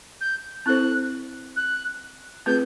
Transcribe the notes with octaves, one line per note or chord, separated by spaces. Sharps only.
G6
C4 E4 A4 C5 F#6
F#6
A3 C4 F4 G#4 B4 G6